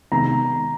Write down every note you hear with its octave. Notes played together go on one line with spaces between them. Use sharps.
C3 D#3 G#3 B3 D#4 A#5